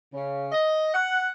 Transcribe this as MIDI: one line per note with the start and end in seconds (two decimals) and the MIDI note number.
0.13 0.46 49
0.52 0.92 75
0.94 1.30 78